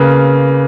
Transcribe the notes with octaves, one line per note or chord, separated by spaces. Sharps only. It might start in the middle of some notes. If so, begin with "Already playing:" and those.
Already playing: C#3 A#3 B4